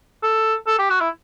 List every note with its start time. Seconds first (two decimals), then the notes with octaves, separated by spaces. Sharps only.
0.23 A4
0.67 A4
0.79 G4
0.90 F#4
1.01 E4